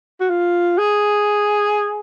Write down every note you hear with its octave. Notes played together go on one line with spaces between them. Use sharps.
F#4
F4
G#4